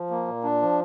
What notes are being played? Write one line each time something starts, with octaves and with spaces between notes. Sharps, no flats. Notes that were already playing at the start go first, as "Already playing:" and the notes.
Already playing: F3
A#3
A#2
D4
F3